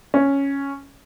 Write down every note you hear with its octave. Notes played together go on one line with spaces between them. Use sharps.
C#4